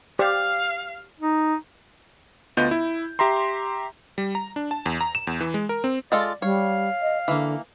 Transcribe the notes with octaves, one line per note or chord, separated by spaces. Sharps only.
G4 C5 D5 F5
D#4
D2 B3 F4 D#5 G6
E4
G4 E5 A#5 C6
G3
A#5
D4
A5
E2
A#5
E7
E2
E3
G#3
A#4
C4
G#3 F4 A4 D5
G3 C#5 F5
D#5
D3 E3 A#3